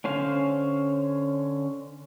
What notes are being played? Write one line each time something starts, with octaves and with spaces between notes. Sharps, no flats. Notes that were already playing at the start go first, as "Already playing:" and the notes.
D3 C#4 C5 F5